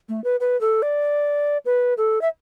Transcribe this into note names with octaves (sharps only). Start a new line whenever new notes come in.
A3
B4
B4
A4
D5
B4
A4
E5